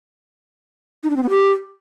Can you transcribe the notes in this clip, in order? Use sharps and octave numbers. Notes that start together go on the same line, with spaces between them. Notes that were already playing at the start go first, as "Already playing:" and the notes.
D#4
D4
C4
B3
G4